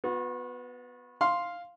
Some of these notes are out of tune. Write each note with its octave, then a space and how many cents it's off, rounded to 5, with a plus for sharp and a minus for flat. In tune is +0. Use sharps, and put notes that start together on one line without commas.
B3 +5 F#4 -40
F5 +0 C6 +0